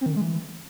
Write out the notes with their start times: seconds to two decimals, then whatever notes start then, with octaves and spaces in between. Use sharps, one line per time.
0.01 C4
0.06 D#3
0.11 D3
0.16 G#3
0.21 E3